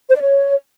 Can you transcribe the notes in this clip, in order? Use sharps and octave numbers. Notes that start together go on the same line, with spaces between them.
C5
D5
C#5